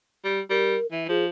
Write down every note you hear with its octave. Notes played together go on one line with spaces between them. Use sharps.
G3
G3 A#4
E3 E5
F3 G#4